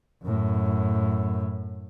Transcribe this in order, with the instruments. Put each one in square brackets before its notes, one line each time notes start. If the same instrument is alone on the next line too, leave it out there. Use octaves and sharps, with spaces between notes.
[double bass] F#2 A2